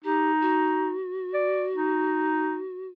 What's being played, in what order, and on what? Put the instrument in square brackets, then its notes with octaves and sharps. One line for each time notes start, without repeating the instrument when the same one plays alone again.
[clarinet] D#4 [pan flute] G4
[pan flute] F#4
[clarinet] D5
D#4